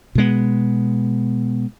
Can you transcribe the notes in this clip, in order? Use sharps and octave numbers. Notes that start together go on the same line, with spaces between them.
B2 G#3 B3